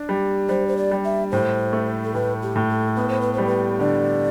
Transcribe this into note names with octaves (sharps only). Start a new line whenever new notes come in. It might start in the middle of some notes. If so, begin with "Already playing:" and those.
Already playing: D4
G3
G3 C5
C5
D5
G3
E5
A2 C5
A3
A4
A2 B4
G4
A2
A4
B3 B4
C5
B4
G3 C5
B4
D3 D5